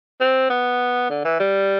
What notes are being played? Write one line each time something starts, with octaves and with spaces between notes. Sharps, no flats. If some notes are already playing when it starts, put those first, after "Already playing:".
C4
B3
D3
E3
G3